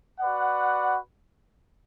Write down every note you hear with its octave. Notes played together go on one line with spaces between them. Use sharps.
F#4 B4 D5 F#5